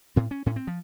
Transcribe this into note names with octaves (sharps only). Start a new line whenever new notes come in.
A2 C4
C#4
A2 C#4
C4
F3